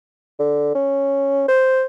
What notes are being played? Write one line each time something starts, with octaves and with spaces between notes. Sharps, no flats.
D3
C#4
C5